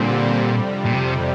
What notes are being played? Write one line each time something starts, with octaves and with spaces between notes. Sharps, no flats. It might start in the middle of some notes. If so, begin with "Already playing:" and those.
Already playing: A#2 D3 G3 C4
F2 C3 G3
A#2
C3